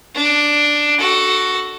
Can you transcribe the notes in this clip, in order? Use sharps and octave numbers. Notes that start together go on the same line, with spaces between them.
D4
F#4 A4